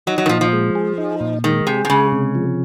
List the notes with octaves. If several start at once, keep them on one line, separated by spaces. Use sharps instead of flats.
F#3 D#4
F#3
D#3
A#2 F3
F3
G#3
G#4
D#4
A#2
D#3 G#3
C3 G#4
C3
C#3 G#3
C3
F3